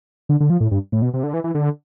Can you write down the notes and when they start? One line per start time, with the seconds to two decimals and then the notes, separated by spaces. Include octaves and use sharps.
0.29 D3
0.40 D3
0.50 F3
0.60 A2
0.71 G2
0.92 A2
1.02 B2
1.14 C3
1.23 D3
1.34 E3
1.44 E3
1.55 D3